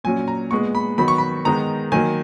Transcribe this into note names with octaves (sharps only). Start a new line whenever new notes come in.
A#2 F#3 C#4 G#5
A#5
A#2 G#3 B3 C#6
B5
D#3 F#3 B3 B5
C#6
B5
D#3 G#3 B3 D#4 A#5
D#3 F#3 A#3 G#5